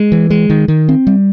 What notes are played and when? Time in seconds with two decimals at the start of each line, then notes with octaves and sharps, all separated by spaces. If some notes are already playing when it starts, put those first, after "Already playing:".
Already playing: G#3
0.12 E3
0.30 G#3
0.50 D#3
0.68 D#3
0.89 C4
1.07 G3